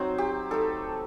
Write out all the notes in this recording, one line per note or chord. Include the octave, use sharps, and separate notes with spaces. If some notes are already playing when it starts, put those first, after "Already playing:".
Already playing: F#3 C4 D#4 C5
G4
A3 D#4 A4